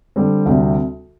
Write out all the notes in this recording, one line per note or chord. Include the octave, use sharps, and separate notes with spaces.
D3 G3 C4
D2 C3 G3 C4